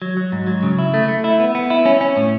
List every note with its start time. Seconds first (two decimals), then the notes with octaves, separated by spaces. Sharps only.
0.02 F#3
0.17 F#3
0.32 G#2
0.47 F#3
0.63 C#3
0.79 E4
0.94 A3
1.08 A3
1.24 E4
1.40 B3
1.55 B3
1.70 E4
1.86 C#4
2.01 C#4
2.17 A2